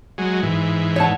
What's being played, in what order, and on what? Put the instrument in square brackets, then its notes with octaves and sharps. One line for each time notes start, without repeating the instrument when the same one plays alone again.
[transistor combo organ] F#3 G#3
G#2 E3
[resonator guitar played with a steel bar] C#5 F#5 A5